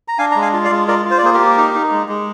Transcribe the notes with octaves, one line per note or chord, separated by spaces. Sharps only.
A#5
D4 F5 G#5
G#3 A#5
F5 G#5
F4
D5 F5
G#3
F4 A#4 D5
F4
C5
D5
A#3 G#4 C5
G4 A#4
A#3
D#4
D#4
G#3
G#3